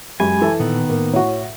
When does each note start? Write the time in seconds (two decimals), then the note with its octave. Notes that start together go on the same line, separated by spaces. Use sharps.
0.20 F#2 G#3 G4 G#5 B5
0.41 E3 A4
0.60 A#2 D#3 B3
0.90 A2 A#3
1.13 A2 F#4 C#5